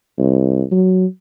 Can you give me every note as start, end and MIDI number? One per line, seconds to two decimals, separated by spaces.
0.18 0.63 36
0.72 1.06 54